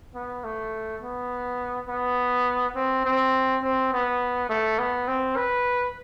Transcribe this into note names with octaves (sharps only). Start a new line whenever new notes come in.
B3
A3
B3
B3
C4
C4
C4
B3
A3
B3
C4
B4